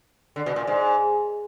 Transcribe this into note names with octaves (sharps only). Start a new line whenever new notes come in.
D3
B2
A#2
G#2